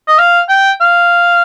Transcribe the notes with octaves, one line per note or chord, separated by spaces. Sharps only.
D#5
F5
G5
F5